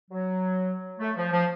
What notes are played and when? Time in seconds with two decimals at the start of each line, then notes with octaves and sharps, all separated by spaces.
0.10 F#3
0.99 A3
1.16 F3
1.32 F3